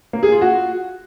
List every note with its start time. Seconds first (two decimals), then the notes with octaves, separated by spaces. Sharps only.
0.13 A#3
0.23 G#4
0.32 F4
0.42 F#4